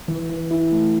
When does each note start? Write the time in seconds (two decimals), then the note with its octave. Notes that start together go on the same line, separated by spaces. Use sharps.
0.08 E3
0.30 E3
0.51 E4
0.72 A3